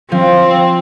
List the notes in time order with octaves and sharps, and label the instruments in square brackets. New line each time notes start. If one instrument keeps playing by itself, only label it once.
[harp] F3 [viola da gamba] C4